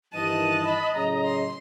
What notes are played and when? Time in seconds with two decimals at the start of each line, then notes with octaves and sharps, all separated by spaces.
0.13 G2 D#3 E3 D#5 A5 F#6 D#7
0.64 B5
0.94 A2 C#3 F#3 A#5
1.25 C6